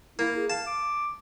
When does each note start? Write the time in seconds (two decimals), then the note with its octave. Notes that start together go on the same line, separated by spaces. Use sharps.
0.19 A#3 E4
0.37 G#4
0.50 F5 A5
0.67 D6